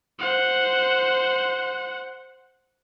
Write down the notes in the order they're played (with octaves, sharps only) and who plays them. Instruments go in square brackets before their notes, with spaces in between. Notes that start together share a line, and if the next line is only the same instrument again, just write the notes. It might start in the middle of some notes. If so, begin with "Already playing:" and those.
[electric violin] C5 F#5